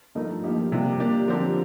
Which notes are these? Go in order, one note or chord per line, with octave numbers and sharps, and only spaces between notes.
G2 F3 A3 D#4 A#4
F3 A#3 D#4 G4
C3 G3 A#3 D4 F4
A#3 D4 G4 D5
D3 F3 C4 G4 A#4